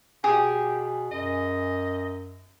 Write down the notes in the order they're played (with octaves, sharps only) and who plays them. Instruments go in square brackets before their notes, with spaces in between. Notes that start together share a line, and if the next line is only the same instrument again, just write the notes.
[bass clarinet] B2 [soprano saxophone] G4 [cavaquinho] G#4 [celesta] G#5
[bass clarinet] F#2 [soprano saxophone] D#5